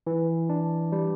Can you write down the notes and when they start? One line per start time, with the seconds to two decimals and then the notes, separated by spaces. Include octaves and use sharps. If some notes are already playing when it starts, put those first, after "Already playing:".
0.07 E3
0.49 D4
0.92 G3